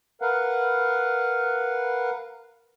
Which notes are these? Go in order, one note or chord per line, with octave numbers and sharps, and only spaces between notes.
A#4 B4 F5 F#5